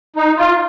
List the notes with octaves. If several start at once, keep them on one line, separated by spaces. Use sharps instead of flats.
D#4
F4